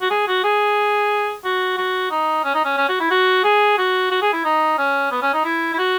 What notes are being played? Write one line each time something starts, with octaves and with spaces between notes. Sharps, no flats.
F#4
G#4
F#4
G#4
F#4
F#4
D#4
C#4
D#4
C#4
C#4
F#4
E4
F#4
G#4
F#4
F#4
G#4
E4
D#4
C#4
B3
C#4
D#4
E4
E4
F#4